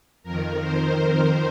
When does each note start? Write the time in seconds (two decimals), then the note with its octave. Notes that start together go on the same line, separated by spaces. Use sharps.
0.23 F2 D#3 A#4
0.61 C5
0.97 A#4